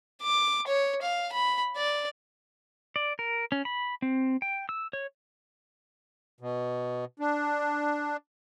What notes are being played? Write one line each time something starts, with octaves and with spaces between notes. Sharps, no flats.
D6
C#5
F5
B5
D5
D5
A#4
C#4
B5
C4
G5
E6
C#5
B2
D4